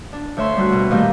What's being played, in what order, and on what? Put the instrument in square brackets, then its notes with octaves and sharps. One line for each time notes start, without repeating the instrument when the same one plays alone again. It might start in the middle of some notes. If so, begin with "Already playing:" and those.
[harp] D4
D2 A3 C#5 E5 C6
G3 A3 F#4
B2
A#2 D#3 G3 A3 F4 G4